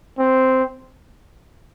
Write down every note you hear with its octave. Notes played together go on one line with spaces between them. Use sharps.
C4